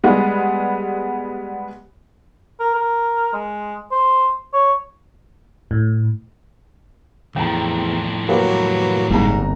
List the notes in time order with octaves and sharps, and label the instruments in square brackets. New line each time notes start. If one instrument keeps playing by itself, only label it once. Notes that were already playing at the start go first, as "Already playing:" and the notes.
[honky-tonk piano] G3 G#3 B3
[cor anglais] A#4
A#4
G#3
C5
C#5
[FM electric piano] A2
[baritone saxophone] E2 [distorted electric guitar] A2 F3 [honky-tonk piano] G5 A#5
[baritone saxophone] F#3 [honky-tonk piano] A#3 G4 B4
[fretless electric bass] G1 A#3 [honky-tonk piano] C2 A#5 [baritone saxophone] G#2